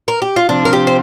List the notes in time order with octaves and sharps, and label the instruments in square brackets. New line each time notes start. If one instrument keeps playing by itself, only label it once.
[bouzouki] A#4
G4
F4
[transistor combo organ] C3 F3 C4 [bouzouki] D4
[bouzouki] A#4
G4
C5